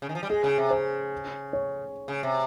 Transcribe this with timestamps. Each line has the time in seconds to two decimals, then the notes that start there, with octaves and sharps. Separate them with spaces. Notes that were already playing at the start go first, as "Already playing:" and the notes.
0.02 C#3
0.09 D#3
0.15 F3
0.23 G3
0.30 G#3 G#4
0.44 C#3
0.58 C3
0.70 C#3 C5
1.53 C#5
2.08 C#3
2.23 C3